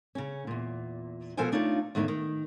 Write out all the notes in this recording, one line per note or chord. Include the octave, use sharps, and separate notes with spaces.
C#3 C#4
E2 A#2
B2 F3 A4 A#4 C5 G#5
A3 D4 D#4 F4 C#5 F5
E2 A2 D#3 D#4
D#3